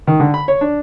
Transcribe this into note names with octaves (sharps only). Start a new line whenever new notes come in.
D#3
D3
B5
C#5
D4